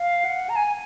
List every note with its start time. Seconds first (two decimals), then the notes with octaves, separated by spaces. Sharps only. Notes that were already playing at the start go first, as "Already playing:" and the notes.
Already playing: F5
0.25 F#5
0.49 A#5
0.56 G#5